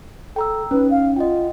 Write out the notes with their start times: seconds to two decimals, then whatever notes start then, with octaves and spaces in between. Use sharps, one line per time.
0.36 A4 G5 A#5 E6
0.71 C#4 D#4 B4
0.91 F5
1.16 F4 D#5 F#5 G5